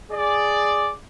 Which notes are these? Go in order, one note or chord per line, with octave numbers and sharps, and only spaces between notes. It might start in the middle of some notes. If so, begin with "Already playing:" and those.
G#4 D5